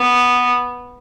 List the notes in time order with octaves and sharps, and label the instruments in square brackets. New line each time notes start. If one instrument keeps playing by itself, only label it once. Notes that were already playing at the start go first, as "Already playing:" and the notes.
Already playing: [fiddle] B3